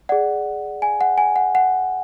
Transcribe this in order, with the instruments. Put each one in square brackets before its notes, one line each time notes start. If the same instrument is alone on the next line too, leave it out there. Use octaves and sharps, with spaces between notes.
[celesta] G#4 D5 F#5
G#5
F#5
G#5
F#5
F#5